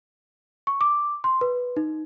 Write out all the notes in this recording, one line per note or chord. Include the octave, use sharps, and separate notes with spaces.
C#6
D6
C6
B4
D#4